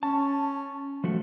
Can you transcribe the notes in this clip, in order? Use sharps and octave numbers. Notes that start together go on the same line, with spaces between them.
C#4 A5
F3 A3 F#4